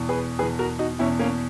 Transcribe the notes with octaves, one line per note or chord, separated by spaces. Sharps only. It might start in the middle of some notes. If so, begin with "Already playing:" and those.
Already playing: E2 B2
G#4 B4
E2 B2 G#4 B4
F#4 A#4
D#4 F#4
E2 B2 C#4 E4
A#3 C#4